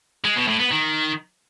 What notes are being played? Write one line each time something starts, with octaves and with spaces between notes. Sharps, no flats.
G#3
B2
A2
B3
D#3